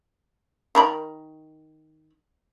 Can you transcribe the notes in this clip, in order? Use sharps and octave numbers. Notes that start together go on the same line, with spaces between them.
D#3 A#4 B5